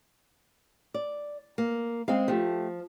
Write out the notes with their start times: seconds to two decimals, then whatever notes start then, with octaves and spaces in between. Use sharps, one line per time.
0.94 D5
1.58 A#3
2.08 G#3 C4 F5
2.28 F3 A3 G4